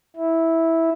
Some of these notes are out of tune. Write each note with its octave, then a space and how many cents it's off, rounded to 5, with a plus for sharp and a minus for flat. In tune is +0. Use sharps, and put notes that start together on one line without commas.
E4 -10